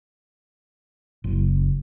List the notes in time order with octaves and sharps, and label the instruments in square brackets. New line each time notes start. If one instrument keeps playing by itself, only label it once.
[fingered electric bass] F#1